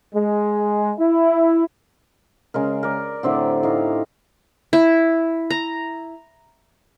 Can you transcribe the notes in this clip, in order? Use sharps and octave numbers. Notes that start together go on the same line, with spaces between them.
G#3
E4
C#3 G#3 A#4
A#4 D5
A2 D3 C4 G4
A2 D#4 F5
E4
A#5